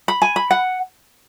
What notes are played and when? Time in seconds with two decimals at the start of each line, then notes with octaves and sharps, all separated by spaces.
0.08 B5
0.22 G#5
0.36 B5
0.51 F#5